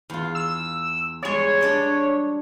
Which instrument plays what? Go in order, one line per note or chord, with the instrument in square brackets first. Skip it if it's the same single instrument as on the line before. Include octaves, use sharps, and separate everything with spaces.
[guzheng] E2 F4
[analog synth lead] E6
[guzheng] G3 G#3 [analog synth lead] C#5
[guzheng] D4 D5 D#5